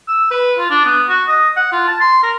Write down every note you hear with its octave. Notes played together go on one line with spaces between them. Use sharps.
E6
B4
F4
D4
B3
F#4
D#5
F#5
F4
A5
C6
A#4